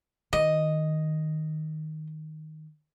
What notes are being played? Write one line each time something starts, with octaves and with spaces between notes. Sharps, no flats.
D#3 D#5